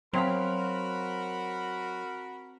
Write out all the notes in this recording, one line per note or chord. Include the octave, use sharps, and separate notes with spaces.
F#3 C4 F#4 A#4 F5 B5 B6